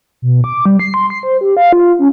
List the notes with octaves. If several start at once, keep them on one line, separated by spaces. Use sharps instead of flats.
B2
D6
G3
C7
C6
C7
C5
G4
F5
F4
C#4